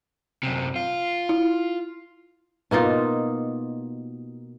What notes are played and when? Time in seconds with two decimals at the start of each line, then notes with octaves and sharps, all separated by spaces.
0.43 F#2 C3
0.76 F4
1.29 E4
2.71 B2 A#3 D#4 F4